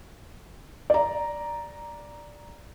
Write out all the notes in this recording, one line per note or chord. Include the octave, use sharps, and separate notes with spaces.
D5 A#5